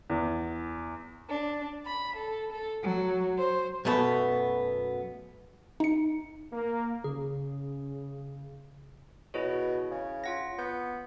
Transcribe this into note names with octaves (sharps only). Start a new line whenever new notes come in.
E2
D4
B5
A4
A4
F#3
C5
F#2 B2 A3 B3
D#4 C#7
A#3
C#3 G#4
B2 E4 G#4 C#5
C#3
F4 F#5 A#6
B3 G6